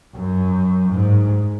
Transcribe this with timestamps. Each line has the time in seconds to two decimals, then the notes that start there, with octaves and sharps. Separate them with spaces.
0.15 F#2
0.93 G#2